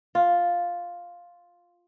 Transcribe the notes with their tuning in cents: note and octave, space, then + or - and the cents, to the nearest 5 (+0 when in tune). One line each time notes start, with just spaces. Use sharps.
F4 +5